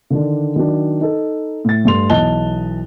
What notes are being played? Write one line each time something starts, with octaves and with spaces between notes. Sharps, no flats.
D3 D#3 D4
D#3 F#3 D4
D#4 A4
A2 A6
G2 A3 C6 F7
B1 E3 D#5 A5 F#6 G7